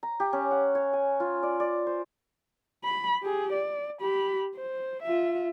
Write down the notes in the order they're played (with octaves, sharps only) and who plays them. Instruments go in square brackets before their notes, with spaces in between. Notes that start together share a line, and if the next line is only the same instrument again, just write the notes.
[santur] A#5
G4
C#4
F#5
C#5
G#5
F4
D5
D5
C5
[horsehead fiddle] B5
G4 G#4
D5
G4 B5
C5
F4 E5